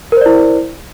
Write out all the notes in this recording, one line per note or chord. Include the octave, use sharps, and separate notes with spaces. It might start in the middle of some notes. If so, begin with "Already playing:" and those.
E4 A#4 C5 D5